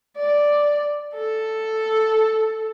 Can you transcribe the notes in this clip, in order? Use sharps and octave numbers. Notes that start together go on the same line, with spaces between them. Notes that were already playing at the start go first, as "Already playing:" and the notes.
D5
A4